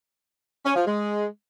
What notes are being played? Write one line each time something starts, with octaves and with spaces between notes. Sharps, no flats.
C#4
F3
G#3